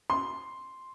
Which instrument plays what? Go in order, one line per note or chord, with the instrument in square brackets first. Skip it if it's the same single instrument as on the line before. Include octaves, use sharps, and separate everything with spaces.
[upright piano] C6